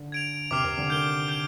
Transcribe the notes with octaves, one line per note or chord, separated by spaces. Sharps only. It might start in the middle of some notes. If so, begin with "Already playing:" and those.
Already playing: D3
G#6 D7 F7
C3 D6 F6 C7 F7
C3
D3
D#3 G6 D7 G7
G6 D7 G7